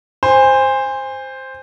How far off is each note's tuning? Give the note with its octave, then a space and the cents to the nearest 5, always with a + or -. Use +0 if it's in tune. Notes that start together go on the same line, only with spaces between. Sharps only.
C5 +0 G#5 -30